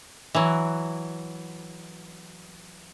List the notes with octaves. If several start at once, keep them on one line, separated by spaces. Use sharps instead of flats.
E3 F#3